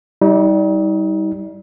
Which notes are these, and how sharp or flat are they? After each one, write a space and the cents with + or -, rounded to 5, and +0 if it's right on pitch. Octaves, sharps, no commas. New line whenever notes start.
G3 -10 D#4 +40